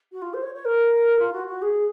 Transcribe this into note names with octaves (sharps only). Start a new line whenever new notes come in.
F#4
F4
C5
C#5
C#5
A#4
F4
F#4
F#4
G#4